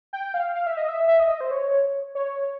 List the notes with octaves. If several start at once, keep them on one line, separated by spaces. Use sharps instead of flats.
G5
F5
F5
E5
D#5
E5
E5
D#5
C5
C#5
C#5